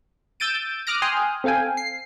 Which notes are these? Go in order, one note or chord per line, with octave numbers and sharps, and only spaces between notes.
E6 G6 A6 D7 D#7
D6 D#6 F6 F#6 A#6 D7
G5 G#5 C6 D#6 F6 F#6
C4 A4 F5 G5 G#5
C7